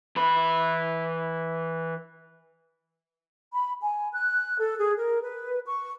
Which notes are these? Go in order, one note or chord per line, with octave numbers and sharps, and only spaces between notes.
E3 B5
B5
G#5
F#6
A4
G#4
A#4
B4
C#6